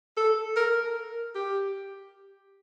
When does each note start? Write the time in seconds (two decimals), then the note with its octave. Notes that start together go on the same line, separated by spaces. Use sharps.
0.17 A4
0.56 A#4
1.35 G4